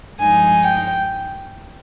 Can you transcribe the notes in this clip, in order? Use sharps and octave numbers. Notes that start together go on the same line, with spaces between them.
G2 F3 G#3 D#4 G#5
G5